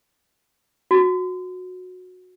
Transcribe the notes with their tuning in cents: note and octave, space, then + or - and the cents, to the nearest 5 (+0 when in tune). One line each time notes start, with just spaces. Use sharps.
F#4 -20